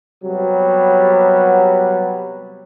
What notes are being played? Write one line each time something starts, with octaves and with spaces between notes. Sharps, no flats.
C3 F#3 G3 B3